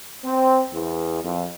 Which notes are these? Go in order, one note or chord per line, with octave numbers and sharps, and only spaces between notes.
C4
E2
F2